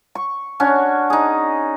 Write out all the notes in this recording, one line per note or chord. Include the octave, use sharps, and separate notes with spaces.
C#6
C#4 D4 F#4
D#4 G#4